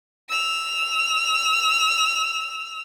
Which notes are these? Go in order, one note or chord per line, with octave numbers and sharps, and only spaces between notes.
E6 F7